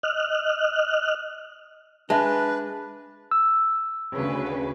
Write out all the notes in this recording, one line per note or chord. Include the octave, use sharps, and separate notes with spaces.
D#5 F6 F#6
G#3 D4 B4 E5 A5
E6
D2 C#3 B4